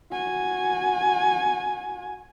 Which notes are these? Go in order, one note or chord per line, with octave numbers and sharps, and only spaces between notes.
F#4 G#5